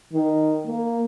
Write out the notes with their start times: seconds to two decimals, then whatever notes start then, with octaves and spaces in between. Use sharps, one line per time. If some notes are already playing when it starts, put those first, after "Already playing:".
0.13 D#3
0.66 A#3